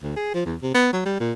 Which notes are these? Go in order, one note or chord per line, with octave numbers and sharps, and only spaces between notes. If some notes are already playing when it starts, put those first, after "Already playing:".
D2
G#4
F3
E2
C3
B3
F#3
G3
A#2